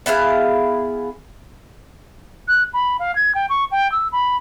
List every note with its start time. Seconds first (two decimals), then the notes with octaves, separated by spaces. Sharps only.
0.06 B3 E4 G#4 F5
2.48 F#6
2.74 B5
2.99 F5
3.15 G#6
3.35 G5
3.50 C#6
3.71 G5
3.92 E6
4.12 B5